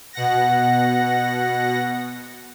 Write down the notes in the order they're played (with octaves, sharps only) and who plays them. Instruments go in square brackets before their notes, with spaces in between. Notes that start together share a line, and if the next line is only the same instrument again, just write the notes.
[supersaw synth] B2 F#5 A#6